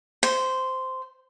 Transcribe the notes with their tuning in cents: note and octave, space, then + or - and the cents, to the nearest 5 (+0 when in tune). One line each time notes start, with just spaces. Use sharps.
C5 -10